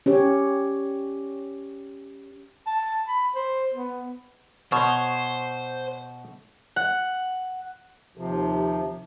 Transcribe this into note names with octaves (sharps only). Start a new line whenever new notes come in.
C#4 G4 C#5
A5
B5
C5
B3
B2 C5 C#5
F#5
D#2 C3 F3